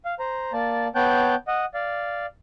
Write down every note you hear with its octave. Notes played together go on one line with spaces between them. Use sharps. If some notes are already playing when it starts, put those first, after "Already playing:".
F5
C5 A#5
A#3 D5 A5
B3 C#5 G5 A5 F#6 G6
D#5 F#5
D5 F5